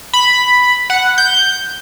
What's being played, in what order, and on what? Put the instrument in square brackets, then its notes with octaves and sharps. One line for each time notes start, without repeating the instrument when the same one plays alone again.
[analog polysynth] B5
F#5
G6